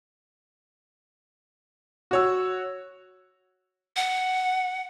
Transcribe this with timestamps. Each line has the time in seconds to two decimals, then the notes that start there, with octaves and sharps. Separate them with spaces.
2.11 F#4 C#5 E6
3.96 F#5